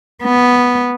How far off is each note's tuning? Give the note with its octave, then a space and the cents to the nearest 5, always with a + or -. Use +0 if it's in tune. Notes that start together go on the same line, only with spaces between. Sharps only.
B3 -5